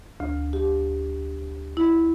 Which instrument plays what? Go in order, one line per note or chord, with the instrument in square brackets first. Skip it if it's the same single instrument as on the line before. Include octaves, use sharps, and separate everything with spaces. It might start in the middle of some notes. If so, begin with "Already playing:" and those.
[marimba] D2
G4
E4